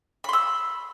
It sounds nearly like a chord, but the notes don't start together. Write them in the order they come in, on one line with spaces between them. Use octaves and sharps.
B5 C6 E6